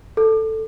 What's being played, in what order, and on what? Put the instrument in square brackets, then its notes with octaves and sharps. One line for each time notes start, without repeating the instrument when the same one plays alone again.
[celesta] A4